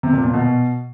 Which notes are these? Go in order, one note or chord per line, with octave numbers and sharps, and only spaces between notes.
C3
A#2
A#2
B2